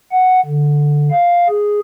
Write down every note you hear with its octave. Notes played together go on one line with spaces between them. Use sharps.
F#5
D3
F5
G#4